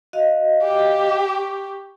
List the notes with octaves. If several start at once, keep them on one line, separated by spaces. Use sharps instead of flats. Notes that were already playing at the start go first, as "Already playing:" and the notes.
F#4 D#5 F5
G4
C#6